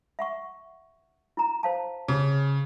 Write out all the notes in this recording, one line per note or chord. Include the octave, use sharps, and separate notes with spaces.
E5 F#5 C#6
E4 A#5
C5 F5 A5
C#3 G#4